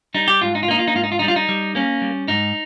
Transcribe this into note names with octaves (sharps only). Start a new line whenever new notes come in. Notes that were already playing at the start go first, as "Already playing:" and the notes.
G3 D#4
G4
G#2 F4
D#4
F4
A#3 D#4
F4
D#4
G#2 F4
D#4
F4
G3 D#4
F4
D#4
G3
A#3 C#4
G3
G#2 D#4